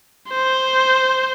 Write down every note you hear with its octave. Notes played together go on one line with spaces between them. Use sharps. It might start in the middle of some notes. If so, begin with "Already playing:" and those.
C5